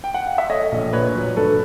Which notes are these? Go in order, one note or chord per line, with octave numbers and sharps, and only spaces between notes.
G5
F#5
F5
E5
A3 C#5 D#5
A#1
A#2 B4 C#5
F#3
G2 A4 B4